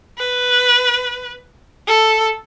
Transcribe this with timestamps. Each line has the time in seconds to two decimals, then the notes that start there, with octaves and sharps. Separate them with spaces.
0.18 B4
1.87 A4